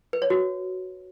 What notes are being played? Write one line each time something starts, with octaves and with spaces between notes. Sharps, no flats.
B4
C#5
F#4